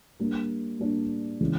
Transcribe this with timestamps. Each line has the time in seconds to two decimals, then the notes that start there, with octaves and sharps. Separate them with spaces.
0.20 G3 A#3 D4
0.80 G3 A#3 D4
1.41 C#3 E3 G#3